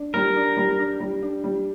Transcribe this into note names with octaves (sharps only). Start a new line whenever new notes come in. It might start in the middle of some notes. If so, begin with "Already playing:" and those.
Already playing: D4
G3 A#4
D4
G3
D4
G3
D4
G3